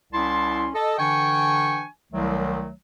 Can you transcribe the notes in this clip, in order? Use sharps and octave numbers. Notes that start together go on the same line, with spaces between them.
C2 C#4 E4 A5 C6
A4 D#5
D3 E3 D4 G5 G#5 C#6
C2 D#3 F#3 A3